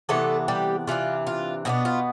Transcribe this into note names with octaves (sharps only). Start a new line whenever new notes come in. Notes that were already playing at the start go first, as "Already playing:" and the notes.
C3 E3 A3 B3 D4 A4
G3 G4
C3 E3 B3 D4 F4
F4
B2 B3 D4 E4
F4